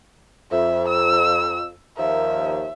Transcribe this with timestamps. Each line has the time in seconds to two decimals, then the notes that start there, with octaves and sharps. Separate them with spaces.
0.51 F2 E5
0.88 E6
1.97 D#2 F3 A#4 E5